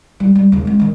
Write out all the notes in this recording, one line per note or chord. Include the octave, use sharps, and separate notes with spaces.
G3
G3
D#2 C#3
G#3 C4
D#3 C#4